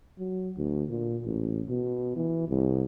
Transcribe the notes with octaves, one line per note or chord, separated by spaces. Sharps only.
F#3
D2
A#2
A1
B2
E3
C2